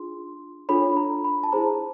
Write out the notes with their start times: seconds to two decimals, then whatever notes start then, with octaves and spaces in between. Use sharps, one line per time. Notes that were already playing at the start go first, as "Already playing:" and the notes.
Already playing: D4 F4 G#4 C6
0.69 D4 F4 A4 C#5 B5
0.97 A#5
1.24 B5
1.43 A5
1.52 E4 G#4 C5 A#5